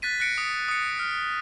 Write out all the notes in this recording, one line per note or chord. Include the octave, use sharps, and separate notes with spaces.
F#6 A6 B6 D#7
F#6 A#6 C#7 D7
D#6
D#6 C#7
F6